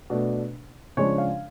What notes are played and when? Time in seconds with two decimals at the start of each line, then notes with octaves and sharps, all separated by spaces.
0.10 B2 A3 D4
0.97 C#3 F3 G#3 D4 C#5
1.18 F5